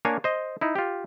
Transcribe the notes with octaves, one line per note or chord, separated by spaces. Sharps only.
A#3 D4 C#5 F5 G#5
C5 D#5
D#4 E4
F4 G4